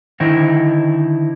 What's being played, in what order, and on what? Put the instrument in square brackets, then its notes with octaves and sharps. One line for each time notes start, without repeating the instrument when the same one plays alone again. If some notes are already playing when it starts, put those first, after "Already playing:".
[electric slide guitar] D3 D#3 D#4 E4 C5